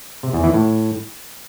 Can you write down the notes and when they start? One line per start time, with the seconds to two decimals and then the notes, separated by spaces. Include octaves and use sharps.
0.23 C3
0.33 E2
0.43 E3
0.54 A2